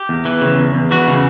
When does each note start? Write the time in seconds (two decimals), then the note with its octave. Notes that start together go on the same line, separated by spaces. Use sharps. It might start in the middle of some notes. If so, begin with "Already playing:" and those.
Already playing: G4
0.09 E2
0.25 E3
0.41 C#3
0.58 E2
0.74 E2
0.91 E3 F#4
1.08 C#3